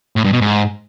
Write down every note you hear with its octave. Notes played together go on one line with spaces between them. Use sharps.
A2
G2
B2
G#2